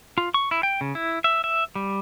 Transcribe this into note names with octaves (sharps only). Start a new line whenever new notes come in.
F4
C#6
E4
G5
C#3
E4
E5
E5
G3